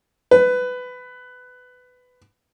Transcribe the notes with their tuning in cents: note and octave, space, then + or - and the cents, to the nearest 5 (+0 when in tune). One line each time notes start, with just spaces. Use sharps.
B4 +15